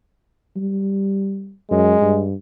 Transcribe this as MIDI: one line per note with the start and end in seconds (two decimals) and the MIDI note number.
0.56 1.54 55
1.71 1.95 42
1.71 2.26 56
2.02 2.34 43